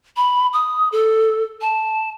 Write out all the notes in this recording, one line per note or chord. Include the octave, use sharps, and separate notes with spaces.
B5
D#6
A4
A5